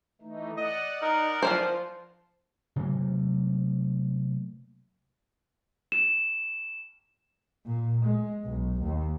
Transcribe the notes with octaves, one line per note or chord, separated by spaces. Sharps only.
E3 A3 D#4
D5 D#5 F#5
D#4 A#4
F3 A#3 F4 C5
C3 F#3 A3 A#3
E7
A#2
G#3
B1
D#2